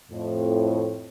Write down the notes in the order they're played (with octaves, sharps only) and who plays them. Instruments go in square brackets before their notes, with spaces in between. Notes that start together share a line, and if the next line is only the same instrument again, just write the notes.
[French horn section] F2 A2